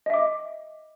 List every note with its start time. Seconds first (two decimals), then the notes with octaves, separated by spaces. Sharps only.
0.06 D#5
0.10 E5
0.14 D6